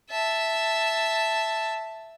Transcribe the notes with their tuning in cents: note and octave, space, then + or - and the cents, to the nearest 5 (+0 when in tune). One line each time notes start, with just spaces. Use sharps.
E5 +0 A5 +0